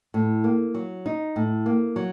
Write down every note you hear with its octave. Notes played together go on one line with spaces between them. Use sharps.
A2
A#3
F#3
D#4
A2
A#3
F#3